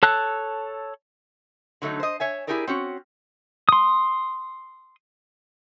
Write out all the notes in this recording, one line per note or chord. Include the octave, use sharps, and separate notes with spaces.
A4 C#5 A5 E6 F#6
D3 F#3 A3 D#4
C5 D#5
C#5 E5 G#5
E4 F4 G4 G#4 A#4 D5
C4 C#4 F#4
C6 D#6